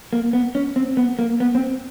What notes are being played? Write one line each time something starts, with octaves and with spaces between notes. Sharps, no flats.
A#3
B3
C#4
C4
B3
A#3
B3
C4